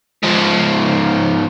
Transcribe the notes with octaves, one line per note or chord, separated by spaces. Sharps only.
G#2 F3